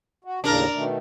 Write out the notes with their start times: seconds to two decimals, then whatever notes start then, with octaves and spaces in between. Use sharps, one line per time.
0.24 F#4
0.44 D#2 A2 C#3 D4 A#4
0.74 B2 D#3 A3